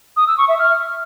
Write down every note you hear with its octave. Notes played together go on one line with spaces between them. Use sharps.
D#6
E6
C#6
E5
F6